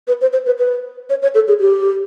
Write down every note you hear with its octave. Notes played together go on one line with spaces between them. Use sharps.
B4
C5
C5
B4
B4
C#5
C#5
A4
G#4
G4